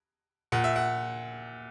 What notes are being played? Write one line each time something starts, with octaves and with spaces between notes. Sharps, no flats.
A#2 F#5
E5
F#5